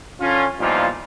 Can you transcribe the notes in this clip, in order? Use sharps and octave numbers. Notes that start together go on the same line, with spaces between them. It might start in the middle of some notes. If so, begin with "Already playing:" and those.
D3 C#4 F4
E2 G2 A#2 F3 D#4 F4